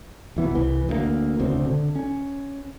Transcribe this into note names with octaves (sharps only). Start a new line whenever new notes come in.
E1 E3 B3
C2 E3
D2 G3 A#3
E1 D2 C#3 C4
D3
C#4